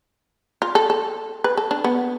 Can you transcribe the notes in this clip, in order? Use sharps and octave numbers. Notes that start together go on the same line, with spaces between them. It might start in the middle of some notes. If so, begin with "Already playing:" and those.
F4
A4
A4
B4
A4
D4
B3